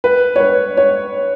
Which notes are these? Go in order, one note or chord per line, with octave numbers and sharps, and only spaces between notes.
B4
C#5
B4
C#5